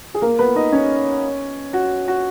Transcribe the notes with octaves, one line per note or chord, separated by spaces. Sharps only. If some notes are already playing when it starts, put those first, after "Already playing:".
G#4
A#3 A#4
B3 B4
D#4 D#5
C#4 C#5
F#4
F#4